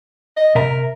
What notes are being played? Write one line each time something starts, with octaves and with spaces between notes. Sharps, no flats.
D#5
C3 A#4 E5 A#5